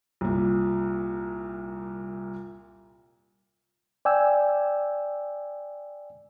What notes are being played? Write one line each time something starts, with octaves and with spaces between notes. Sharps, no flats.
C2 A#2
D5 G5 G#5 E6